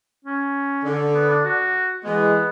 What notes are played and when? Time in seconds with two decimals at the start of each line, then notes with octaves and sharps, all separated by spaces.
0.25 C#4
0.84 D3
1.15 B3
1.30 D4
1.45 F#4
2.04 E3 G#3 B3